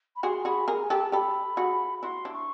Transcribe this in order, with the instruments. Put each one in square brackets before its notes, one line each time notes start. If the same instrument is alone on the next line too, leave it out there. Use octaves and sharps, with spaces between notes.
[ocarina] B5
[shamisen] F#4 G#4 [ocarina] C6
[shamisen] F#4 G#4 [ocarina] B5
[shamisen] G#4 A#4 [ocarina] A#5
[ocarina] G#5
[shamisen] G4 A4 [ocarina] A5
[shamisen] G4 A4 [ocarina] B5
[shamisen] F#4 G#4
[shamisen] E4 F#4 [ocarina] C6
[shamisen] D4 E4
[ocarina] C#6